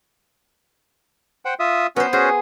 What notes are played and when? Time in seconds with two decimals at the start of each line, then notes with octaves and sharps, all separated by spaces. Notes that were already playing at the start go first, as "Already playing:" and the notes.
1.45 C5 F#5 G5
1.60 F4 E5 D#6
1.96 B3 C#4 F#4 C5
2.13 C#4 F#4 G#4 C5